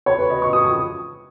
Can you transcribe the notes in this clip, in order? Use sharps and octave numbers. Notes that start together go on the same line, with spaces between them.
C#5
B4
D#5
C#6
D#6
D#6